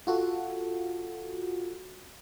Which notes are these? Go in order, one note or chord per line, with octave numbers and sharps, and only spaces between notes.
F4 F#4 A4